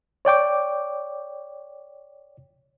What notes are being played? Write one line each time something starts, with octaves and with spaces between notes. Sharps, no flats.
C#5 D5 G5 D6